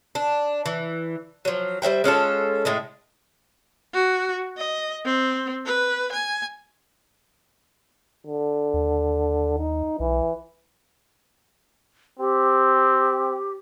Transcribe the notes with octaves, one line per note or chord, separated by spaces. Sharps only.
D4
E3
F3 F#3
G3 C5 E5 G5
G#3 C#4 F4 A4
A2 G#3 A3
F#4
D#5
C4
B4
G#5
D3
D#2
D#4
B1 E3
C4 G4